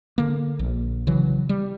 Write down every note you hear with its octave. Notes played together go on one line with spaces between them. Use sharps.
D3 A#3
A#1
C#3 E3 F#3
G3